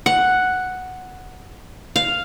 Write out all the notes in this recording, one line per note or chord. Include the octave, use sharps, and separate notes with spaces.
F#5
F5